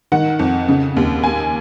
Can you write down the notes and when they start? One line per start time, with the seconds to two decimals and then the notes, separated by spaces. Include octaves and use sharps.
0.12 D#3 F#5
0.39 F2
0.68 C#3
0.97 D#2
1.24 A#3 G#5